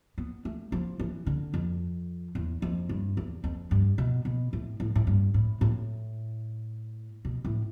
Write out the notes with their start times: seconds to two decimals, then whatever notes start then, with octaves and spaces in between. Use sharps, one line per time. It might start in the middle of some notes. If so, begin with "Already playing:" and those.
0.18 B3
0.45 A3
0.72 F3
1.00 E3
1.26 D3
1.54 F2
2.35 E2
2.62 F2
2.89 G2
3.17 E2
3.44 F2
3.71 G2
3.98 B2
4.25 B2
4.53 A2
4.80 A2
4.95 A2
5.07 G2
5.34 A2
5.61 A2
7.25 B2
7.45 A2